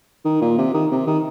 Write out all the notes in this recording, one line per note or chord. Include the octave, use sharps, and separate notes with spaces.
D#3
A#2
C3
D#3
C3
D#3